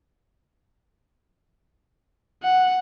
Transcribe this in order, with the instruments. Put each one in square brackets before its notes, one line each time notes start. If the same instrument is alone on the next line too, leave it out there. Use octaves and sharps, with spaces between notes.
[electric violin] F#5